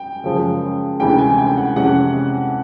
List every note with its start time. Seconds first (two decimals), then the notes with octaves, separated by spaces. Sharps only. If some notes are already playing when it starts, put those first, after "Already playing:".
Already playing: G5
0.24 F#2 C#3 F3 G#3
1.00 D2 C3 E3 G#3 C#4 G5
1.18 G#5
1.38 G5
1.57 F#5
1.76 F2 C3 E3 G#3 C#4 F#5